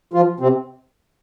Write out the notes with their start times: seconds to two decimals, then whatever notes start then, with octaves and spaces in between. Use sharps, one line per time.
0.13 F3 F4
0.40 C3 C4